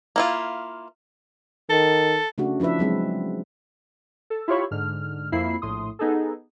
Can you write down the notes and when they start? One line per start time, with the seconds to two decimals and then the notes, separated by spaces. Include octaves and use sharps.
0.16 A#3 E4 F4
1.70 D#3 A4
2.38 C#3 A3 D4 F#4
2.60 F3 D4 E4 B4 E5
2.79 F#3 G#3 C4
4.30 A4
4.48 E4 F4 G4 C#5 B5 C#6
4.71 G#2 D3 F6
5.32 F2 A#3 E4 B5 C7
5.62 A#1 A2 C6 D#6
5.99 B3 D#4 G#4 A4